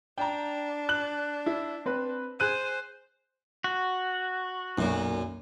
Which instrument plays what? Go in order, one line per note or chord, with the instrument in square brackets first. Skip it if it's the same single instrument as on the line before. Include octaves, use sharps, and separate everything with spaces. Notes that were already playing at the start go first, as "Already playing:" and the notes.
[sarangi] D4 [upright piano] G5 A#5
[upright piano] F#6 F#7
E4
C4 B4
[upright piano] G#4 F#6 D#7 [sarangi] C5
[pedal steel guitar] F#4
[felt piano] B1 [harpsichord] F#2 A#2